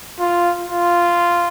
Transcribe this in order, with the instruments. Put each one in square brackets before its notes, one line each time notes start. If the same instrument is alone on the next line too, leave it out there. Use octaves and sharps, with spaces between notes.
[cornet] F4
F4